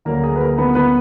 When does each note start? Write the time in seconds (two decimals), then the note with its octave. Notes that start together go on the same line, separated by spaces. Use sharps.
0.05 D2 D3 F#3 A#3 A#4
0.24 G#4
0.36 B4
0.40 A#3 A#4
0.58 B3 B4
0.75 B3 B4